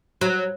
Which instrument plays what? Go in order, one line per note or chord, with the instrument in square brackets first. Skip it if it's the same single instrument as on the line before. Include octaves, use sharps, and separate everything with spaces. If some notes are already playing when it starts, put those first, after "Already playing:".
[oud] F#3